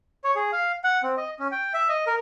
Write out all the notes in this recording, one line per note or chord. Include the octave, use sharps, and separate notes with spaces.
C#5
G#4
F5
F#5
C4
D#5
C#4
G5
E5
D#5
A#4